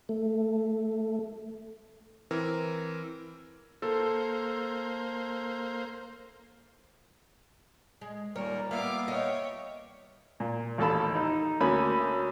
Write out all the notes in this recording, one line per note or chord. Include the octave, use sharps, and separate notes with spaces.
A3
E3 C4 A#4
A#3 A4 C5
G#3
D#2 A#2 G3 A#4 C#5
A#3 B3 F4 E5 F5 D6 F6
C#5 D#5 G5
A#2
A1 D#2 A4 A5 B5
D#4
D2 A#3 C#4 A#5 B5